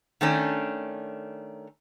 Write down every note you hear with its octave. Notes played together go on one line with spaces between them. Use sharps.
D#3 A3 C#4 D4